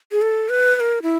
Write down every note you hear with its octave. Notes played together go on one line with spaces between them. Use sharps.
G#4
A4
B4
B4
A#4
E4